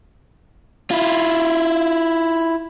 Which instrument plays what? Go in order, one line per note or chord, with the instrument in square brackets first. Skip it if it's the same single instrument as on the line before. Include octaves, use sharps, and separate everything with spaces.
[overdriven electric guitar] E4 F4